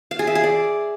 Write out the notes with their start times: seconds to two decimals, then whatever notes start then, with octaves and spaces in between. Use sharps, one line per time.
0.11 F5
0.19 G#4
0.27 E5
0.35 G#4
0.43 D5